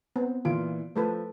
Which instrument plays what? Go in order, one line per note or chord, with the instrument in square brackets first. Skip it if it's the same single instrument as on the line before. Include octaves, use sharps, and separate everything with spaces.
[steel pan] B3 [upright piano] C4
[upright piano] A#2 E3 D7 [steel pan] F4
[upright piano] F3 [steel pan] A3 A4 B4